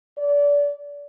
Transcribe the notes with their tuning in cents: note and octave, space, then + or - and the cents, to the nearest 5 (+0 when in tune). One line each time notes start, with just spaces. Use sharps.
D5 -30